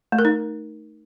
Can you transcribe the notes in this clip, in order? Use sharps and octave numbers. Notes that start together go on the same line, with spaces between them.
A3
A#4
D#4